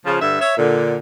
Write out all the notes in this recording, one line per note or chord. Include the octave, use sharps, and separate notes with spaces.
C#3 F3
G2 D3 E5
C#5 E5
A#2 D3